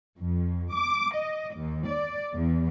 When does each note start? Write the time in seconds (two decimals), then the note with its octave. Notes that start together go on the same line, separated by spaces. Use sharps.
0.18 F2
0.73 D6
1.14 D#5
1.55 D#2
1.88 D5
2.33 E2